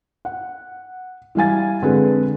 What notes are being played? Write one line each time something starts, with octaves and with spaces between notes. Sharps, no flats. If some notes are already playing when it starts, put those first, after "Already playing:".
F#5
E3 G3 F5 G#5 A6
F2 D3 G#3 A4 B4